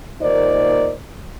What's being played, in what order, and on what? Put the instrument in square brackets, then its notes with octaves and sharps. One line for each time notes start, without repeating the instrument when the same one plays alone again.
[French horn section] D#2 A#2 D#4 A#4 C5 D5